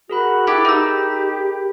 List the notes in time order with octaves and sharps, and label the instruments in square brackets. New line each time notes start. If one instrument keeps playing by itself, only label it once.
[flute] F#4 [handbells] G#4 A#4 B5
[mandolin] E4 G4 A4
[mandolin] D#4 E6 [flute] G4